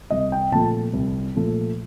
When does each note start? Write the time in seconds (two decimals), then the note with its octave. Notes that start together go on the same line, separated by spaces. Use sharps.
0.10 C2 D#5
0.32 G5
0.52 A#2 F3 A3 A5
0.93 C2
1.36 A#2 F3 A3